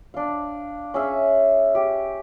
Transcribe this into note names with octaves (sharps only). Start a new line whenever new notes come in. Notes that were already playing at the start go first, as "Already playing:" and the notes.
D4 F5
C#4 G#4 E5
G4